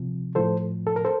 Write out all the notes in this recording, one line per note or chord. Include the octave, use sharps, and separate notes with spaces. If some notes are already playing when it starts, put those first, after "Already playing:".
Already playing: C3 F3
A2 F3 A4 C5
A4
A#4
A4 C5